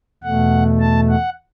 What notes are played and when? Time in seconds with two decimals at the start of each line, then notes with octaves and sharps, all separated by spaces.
0.23 E2 B2 A3 F#5
0.80 A5
1.09 F#5